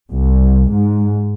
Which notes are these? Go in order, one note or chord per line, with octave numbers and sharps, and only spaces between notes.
C2
G#2